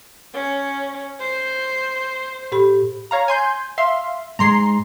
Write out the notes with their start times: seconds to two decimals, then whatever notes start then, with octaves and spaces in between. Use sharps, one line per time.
0.34 C#4
1.20 C5
2.52 A2 G4 B5
3.11 C#5 F5 A#5
3.28 G#5 C6 G6
3.78 E5 F5 C6
4.39 G#2 G#3 A#5 C6 C7